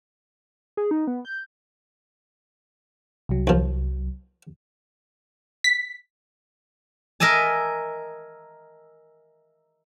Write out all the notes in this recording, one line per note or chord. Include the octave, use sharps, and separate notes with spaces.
G#4
D#4
B3
G6
C2 F#3
D#2 F3
B6
A#4 D#5 E5 G#5 A5